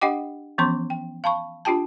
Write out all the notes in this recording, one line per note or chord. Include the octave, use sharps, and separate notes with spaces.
D4 G4 D#5 F#5 G5 D6
E3 F3 B3 C#4 C6 C#6
G5
F5 A5 B5 C#6
D4 F4 G4 G5 A5